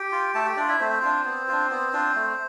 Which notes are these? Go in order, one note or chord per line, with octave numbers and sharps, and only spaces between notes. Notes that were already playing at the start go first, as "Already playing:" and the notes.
Already playing: G4 G5
F4
A3 A4 A5
G4 G5
D4 F4 D5
E4 E5
A3 C4 C5
D4 F4
B3
D4 F4
B3
D4 F4
A3